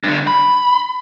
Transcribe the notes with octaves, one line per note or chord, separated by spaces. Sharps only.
G2 D3
B5